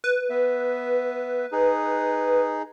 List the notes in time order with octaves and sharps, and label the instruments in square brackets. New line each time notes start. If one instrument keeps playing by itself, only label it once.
[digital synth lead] B4
[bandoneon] B3 E5
D#4 G#4